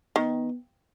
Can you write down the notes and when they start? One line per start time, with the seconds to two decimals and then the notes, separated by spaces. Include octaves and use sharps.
0.16 D#3 B3